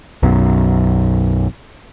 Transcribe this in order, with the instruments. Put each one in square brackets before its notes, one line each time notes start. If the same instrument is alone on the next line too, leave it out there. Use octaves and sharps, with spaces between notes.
[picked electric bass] B1 F#2